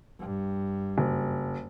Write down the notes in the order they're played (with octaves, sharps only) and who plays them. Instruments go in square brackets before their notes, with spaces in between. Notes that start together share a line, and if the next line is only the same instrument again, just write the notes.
[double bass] G2
[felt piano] F#1